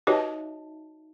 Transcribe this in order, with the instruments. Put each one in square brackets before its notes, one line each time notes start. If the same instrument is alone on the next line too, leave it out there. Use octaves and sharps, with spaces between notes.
[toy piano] D#4 E5 A5 [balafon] F#4 C#5 D#5 [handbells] G4 B4